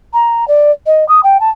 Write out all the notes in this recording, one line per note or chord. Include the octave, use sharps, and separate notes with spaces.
A#5
D5
D#5
D#6
G5
A5